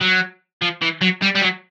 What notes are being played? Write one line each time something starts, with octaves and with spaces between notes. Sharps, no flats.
F#3
F3
E3
F#3
G3
G3
F#3